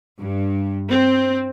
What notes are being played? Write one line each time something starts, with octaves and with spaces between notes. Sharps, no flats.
G2
C4